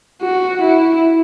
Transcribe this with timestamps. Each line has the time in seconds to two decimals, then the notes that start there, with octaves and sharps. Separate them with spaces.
0.22 F#4
0.62 E4